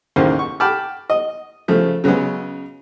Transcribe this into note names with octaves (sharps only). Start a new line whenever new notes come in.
A1 D#2 C#3 A#3 C5
C#6
G5 A5 B5 D6 F6
D#5
C#3 F3 A3
C#3 F#3 G#3 B3 C#4